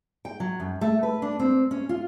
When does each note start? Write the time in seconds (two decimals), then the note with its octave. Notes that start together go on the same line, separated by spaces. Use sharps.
0.25 G5
0.40 F#3
0.60 F#2
0.81 A3
1.03 B4
1.22 D4
1.39 C4
1.71 C#4
1.89 F4